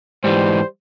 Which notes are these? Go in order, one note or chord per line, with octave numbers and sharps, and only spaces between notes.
G#2 E3 G3 C5